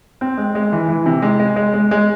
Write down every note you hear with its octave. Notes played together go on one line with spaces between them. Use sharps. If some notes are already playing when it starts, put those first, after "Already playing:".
C4
G#3
G#3
E3
E3
C3
G#3
G#3
G#3
G#3
G#3